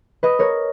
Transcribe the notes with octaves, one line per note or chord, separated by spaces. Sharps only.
B4 D#5
A#4 C#5